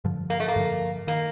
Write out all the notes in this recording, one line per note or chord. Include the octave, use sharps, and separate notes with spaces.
G2 D3 F3
A#3
A3
A#3
G2 D3 F3
D#3 A#3